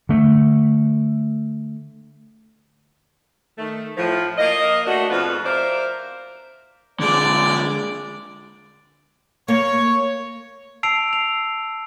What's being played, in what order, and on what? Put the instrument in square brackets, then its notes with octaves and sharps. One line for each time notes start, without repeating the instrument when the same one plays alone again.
[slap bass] D3 A3
[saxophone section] D#3 A3
A2 F3
A#3 D#5
A3 D4 F#4
F2 G#2 B2 F4 B4
A#4 C5 D5 E5 F5
[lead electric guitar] D3 G#3 [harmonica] D5
[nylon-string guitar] A#3 [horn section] C#5
[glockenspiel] A5 E6 C7 D7 F7
F7